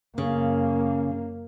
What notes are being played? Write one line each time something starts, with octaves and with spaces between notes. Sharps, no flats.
F#2 C#3 A#3